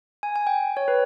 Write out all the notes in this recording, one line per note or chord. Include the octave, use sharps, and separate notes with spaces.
G#5
G#5
G5
C#5
B4